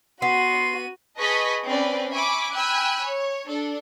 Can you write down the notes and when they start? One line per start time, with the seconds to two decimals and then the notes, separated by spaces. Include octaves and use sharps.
0.22 B3 F#4 C6 D#7
1.18 G#4 B4 D#5 A5 C#6 B6
1.65 C4 C#4 B4 D5
2.11 E5 G#5 B5 C#6 D6
2.52 G5 G#5 B5 E6 F#6
3.02 C#5
3.46 D4 A4